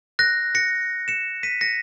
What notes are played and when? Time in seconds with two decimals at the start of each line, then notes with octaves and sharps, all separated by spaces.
0.19 F#6 A#6
0.55 A#6 C#7
1.08 C#7 E7
1.43 B6 D#7
1.61 A#6 C#7